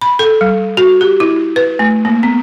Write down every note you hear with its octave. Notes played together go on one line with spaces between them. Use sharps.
B5
A4
G3
F#4
G4
E4
B4
A3
A#3
B3